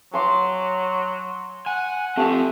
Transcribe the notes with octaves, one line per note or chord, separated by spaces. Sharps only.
F#3 G#5 C6 D6
F#5 G#5
A3 C4 F4 G4 G5